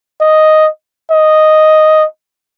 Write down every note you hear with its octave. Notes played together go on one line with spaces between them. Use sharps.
D#5
D#5